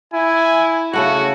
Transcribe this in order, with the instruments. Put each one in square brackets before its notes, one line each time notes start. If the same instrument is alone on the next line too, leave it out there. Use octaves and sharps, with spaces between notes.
[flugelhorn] E4 [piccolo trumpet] G#5
[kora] C#3 A3 F#5 [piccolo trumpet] F#4